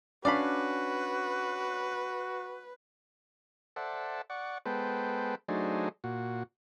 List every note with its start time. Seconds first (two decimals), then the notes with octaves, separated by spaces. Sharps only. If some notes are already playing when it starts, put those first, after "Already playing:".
0.25 C#4 D4 F#4 B4 D5 F5 B5
3.76 A4 C5 D5 E5 F#5
4.30 D5 F#5 C#6
4.66 G#3 B3 A4 B4 C5 G5
5.48 F#3 A3 D4 D#4 G#4 C5
6.04 A#2 F#4